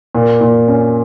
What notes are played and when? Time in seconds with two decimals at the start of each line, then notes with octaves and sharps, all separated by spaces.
0.15 A#2
0.41 A#2
0.68 C#4